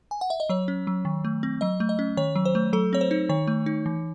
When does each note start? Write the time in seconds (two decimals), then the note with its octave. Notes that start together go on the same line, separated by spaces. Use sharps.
0.11 G#5
0.21 F#5
0.30 E5
0.40 D#5
0.49 F#3 C#5
0.68 C#4
0.87 F#3
1.05 D#3
1.25 A3
1.43 C4
1.61 F#3 D#5
1.80 A3
1.89 D#5
1.99 C#4
2.17 D#3 C#5
2.36 F#3
2.45 C5
2.55 A3
2.73 F#3 A4
2.93 C4 C#5
3.01 C5
3.11 D#4
3.29 D#3 C#5
3.47 A3
3.66 D#4
3.86 E3